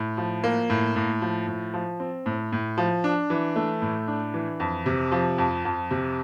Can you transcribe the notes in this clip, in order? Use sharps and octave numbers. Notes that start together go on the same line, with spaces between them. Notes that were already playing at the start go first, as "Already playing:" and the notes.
Already playing: A2
F3
A#3
A2
A2
F3
A2
F3
C4
A2
A2
F3
D4
E3
A3
A2
D4
E3
F2
C3
F3
F2
F2
C3